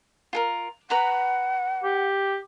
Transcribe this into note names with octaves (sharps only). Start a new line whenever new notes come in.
F4 A4 A#4
B4 F#5 A#5 B5
G4